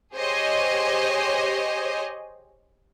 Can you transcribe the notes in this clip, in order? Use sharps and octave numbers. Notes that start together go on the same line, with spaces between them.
G4 G#4 C5 C#5 D#5 G#5